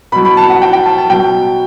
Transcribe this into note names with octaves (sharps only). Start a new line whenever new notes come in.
B2 F#3 B5
B5
A5
F#5
G5
G5
A5
A5
B2 F#3 G5